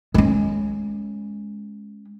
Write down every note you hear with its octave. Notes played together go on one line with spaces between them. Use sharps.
G#3 C#4